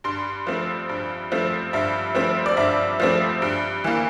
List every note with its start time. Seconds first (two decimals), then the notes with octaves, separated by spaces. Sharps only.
0.04 G2 C6
0.47 F3 A3 C4
0.89 G2
1.32 F3 A3 C4
1.73 G2 E5
2.15 F3 A3 C4
2.46 D5
2.57 G2 E5
3.00 F3 A3 C4
3.42 G2
3.84 E3 A#3